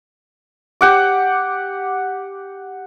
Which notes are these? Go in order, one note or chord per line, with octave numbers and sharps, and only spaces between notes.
G4 F#5 D6